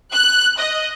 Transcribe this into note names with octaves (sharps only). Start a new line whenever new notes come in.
F#6
D#5